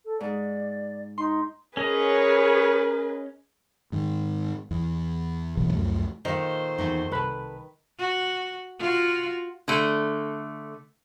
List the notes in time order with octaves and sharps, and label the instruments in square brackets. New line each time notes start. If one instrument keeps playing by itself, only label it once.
[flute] A4
[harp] G#2 [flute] D5
[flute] D#4 [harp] C6
[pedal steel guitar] C#4 D#5 [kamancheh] G#4 B4 [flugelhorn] A#4 [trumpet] C#5
[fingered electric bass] G#2 D#3
E2
D#1 B1 B2 E3
C#2 F#2 F3 A3
[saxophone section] A#2 A3 C5 [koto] D#3 [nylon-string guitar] D#5 F5
[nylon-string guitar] E2 D#4
[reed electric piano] C2 B4 B5 [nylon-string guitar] A4 A5
[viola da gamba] F#4
F4 F#4
[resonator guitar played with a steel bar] D3 A3